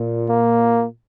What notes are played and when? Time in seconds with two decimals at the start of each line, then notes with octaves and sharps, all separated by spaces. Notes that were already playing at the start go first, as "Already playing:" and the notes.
Already playing: A#2
0.29 A#3